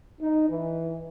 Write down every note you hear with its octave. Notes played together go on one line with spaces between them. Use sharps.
D#4
E3